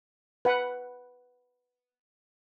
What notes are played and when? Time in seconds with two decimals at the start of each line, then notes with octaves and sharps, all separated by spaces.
0.45 B4 F#5